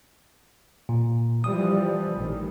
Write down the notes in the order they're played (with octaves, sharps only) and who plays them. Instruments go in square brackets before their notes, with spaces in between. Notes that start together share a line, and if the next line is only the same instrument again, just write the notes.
[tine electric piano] A#2
[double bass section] E3 F3 G3 [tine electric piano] D#6
[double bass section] A1 D#3